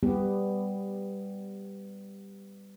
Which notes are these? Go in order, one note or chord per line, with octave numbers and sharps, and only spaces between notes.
G3 B3 G4